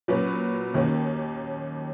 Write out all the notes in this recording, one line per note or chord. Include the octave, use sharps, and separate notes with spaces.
A#2 F#3 C#4 F#4 B4
D#2 D#3 A#3 C#4